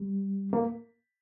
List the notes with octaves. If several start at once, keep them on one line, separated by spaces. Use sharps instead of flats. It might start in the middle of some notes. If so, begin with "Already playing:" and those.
Already playing: G3
A#3